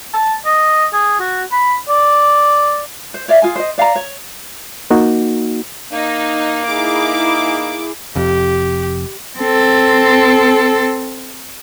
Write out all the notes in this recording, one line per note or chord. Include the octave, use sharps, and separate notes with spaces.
A5
D#5
G#4
F#4
B5
D5
C5
C#5 D5 E5 F5
F4 G#4 G#5
C5 D#5
D5 F5 G5 A#5
C#5
A#3 D#4 F#4
A#3 D#4
D#4 E4 G#4 D6
F1 F2 G4
C4 A4